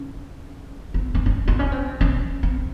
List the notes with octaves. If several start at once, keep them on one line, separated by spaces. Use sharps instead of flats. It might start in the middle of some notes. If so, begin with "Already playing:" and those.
Already playing: C#4
C4
C4
C#4
C4
C#4
C4
C#4
C4